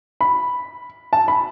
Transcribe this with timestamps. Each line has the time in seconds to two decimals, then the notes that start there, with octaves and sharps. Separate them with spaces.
0.21 B5
1.13 A5
1.28 B5